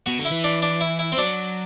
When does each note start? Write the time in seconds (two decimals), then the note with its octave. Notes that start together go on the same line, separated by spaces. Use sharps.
0.06 B2 F#4
0.19 D3
0.25 E4
0.31 E3
0.44 D4
0.62 D4
0.81 E4
0.99 E4
1.12 C4
1.18 F#3 D4